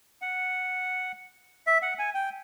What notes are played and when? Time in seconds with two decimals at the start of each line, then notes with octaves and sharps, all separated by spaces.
0.22 F#5
1.67 E5
1.82 F#5
1.99 G#5
2.15 G5